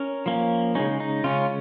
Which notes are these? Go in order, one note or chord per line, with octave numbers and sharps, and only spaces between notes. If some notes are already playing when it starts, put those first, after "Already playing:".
Already playing: C#4 A#4
F3 A#3 C#4
C#3 G#3 C#4 D#4
D#4
C#3 G#3 C#4 F4